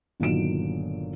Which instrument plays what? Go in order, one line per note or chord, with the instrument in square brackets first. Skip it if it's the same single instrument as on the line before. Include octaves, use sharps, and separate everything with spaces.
[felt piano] G1 A#2 D#3 F#3 D7 E7